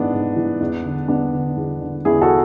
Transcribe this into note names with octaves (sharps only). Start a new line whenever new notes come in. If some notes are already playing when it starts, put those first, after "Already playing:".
Already playing: G#2 E3 B3 D4
G#2
E3
E2
D3
E2 B3 D4
D3
E2
D3
E2 E4 G#4
F#4 A4